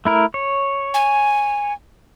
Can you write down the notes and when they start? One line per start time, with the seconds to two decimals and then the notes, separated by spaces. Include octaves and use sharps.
0.05 A3 E4 A#4
0.34 C#5
0.94 G#5